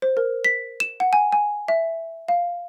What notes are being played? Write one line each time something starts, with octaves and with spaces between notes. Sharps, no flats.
C5
A#4
B6
E7
F#5
G#5
G#5
E5
F5